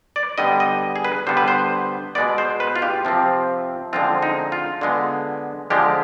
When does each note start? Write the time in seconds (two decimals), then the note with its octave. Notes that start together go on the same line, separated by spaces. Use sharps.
0.16 D5
0.38 D3 G3 B3 D#5
0.60 D#5
0.96 G#4
1.04 B4
1.27 D3 G3 B3 C5
1.37 B4
1.48 C5
2.15 B2 G#3 B3 D5
2.38 C5
2.60 B4
2.76 F4
2.82 G4
3.05 C3 F3 C4
3.93 D3 F3 G#3 C4 F4
4.22 D#4
4.52 F4
4.81 D3 G#3 B3
5.70 D3 F3 G#3 G4